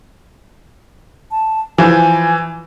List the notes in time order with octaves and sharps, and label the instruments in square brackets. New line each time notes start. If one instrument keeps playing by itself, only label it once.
[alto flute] A5
[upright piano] E3 [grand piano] F3 [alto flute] G#5